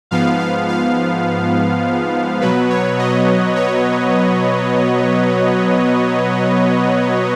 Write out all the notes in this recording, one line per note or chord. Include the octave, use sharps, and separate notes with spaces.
G#2 F3 B3 F5
F5
F5
B2 F#3 B3 B4
C#5
D#5
C#5